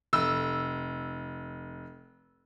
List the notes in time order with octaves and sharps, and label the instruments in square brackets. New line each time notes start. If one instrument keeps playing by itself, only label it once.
[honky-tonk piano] F1 E6